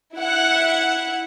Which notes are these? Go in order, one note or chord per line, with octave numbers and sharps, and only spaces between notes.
E4 F#5